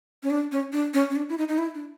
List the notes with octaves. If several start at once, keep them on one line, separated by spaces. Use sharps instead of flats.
C#4
D4
C#4
D4
C#4
C#4
D4
E4
D#4
D#4
E4
D4